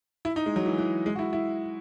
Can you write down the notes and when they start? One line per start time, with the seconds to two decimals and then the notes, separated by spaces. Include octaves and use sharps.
0.25 E4
0.36 D#4
0.46 G#3
0.56 F#3
0.66 E3
0.78 E3
1.06 G#3
1.16 F#4
1.19 E4
1.33 E4